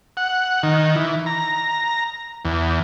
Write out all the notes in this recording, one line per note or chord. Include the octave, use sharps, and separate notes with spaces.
F#5
D#3
E3
A#5
E2